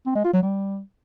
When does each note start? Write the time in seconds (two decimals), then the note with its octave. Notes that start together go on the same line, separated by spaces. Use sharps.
0.06 C4
0.15 G#3
0.24 F4
0.33 F#3
0.42 G3